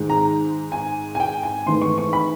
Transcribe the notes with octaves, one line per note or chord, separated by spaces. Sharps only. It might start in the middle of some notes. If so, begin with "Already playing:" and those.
Already playing: G#2 D#3 G#3
A#5
G#5
G#5
G5
G#5
G#2 E3 A3 C6
C#6
C#6
B5